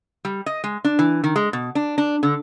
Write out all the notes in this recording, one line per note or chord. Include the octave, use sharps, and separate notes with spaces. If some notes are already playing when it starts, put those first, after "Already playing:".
G3
D#5
G#3
D4
E3
D#3
G#3
B2
D4
D4
D3